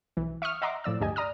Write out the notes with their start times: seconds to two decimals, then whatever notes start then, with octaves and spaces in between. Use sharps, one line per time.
0.17 B1 E3
0.42 E5 C#6 D#6 F6
0.62 D#5 E5 F#5 A#5 C6 D6
0.84 A2 F3 D5 E6
1.01 D2 G2 G4 D#5 G#5
1.16 D5 A#5 D#6 F6